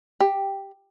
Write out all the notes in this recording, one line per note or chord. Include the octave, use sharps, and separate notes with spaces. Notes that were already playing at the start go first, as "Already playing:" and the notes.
G4